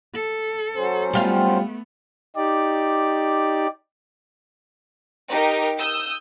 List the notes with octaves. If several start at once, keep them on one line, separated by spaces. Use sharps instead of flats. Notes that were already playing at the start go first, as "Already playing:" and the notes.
A4
F#3 C#4 C5
G3 A3 B3 F4 F5
D#4 G4 D5
D#4 G4 A#4
D#6 E6 G6